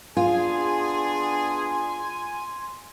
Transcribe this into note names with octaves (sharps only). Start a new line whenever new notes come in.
B3 D4 F4 G#4 G#5 C6